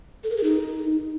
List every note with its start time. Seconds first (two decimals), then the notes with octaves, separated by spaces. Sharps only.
0.24 A4
0.30 A#4
0.37 G#4
0.44 D#4